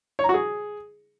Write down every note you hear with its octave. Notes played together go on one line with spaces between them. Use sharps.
C#5
A#5
F#4
G#4